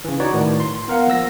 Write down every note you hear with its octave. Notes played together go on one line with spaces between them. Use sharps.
C#3 E3
D#4 F#4 B4 C#5 D5
A2 D#3
C6
B3 A#4 F5 F#5
F3 A#3 E6 A#6